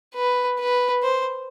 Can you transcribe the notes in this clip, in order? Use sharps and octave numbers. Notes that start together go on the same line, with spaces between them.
B4
B4
C5